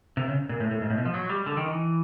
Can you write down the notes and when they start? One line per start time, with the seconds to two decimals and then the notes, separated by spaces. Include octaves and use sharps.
0.17 C3
0.28 C#3
0.49 A#2
0.60 A2
0.71 A2
0.82 G#2
0.90 A2
0.98 B2
1.05 F3
1.14 F#3
1.29 G3
1.46 D3
1.57 D#3
1.68 E3